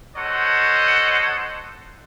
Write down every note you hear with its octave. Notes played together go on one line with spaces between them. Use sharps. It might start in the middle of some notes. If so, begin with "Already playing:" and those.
F#4 A4 C5 C#5 D#5 F#5